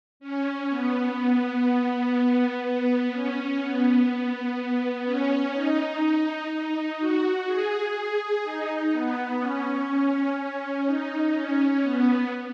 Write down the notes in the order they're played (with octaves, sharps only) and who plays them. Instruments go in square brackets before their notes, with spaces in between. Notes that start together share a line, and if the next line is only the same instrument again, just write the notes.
[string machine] C#4
B3
B3
C#4
B3
C#4
D#4
D#4
F#4
G#4
D#4
B3
C#4
C#4
D#4
C#4
B3